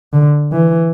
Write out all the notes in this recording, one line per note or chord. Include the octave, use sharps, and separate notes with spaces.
D3
E3